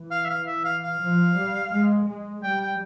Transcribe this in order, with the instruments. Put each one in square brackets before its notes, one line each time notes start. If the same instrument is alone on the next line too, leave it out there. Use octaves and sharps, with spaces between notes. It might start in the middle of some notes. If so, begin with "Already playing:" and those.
Already playing: [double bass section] E3
[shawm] F5
E5
F5
E5
F5
F5
[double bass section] F3
G3
G#3
G#3
[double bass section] G3 [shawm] G5
[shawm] G5